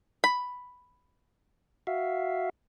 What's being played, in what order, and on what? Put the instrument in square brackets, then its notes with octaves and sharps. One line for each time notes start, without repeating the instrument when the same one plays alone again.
[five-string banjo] B5
[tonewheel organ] F#4 E5 F5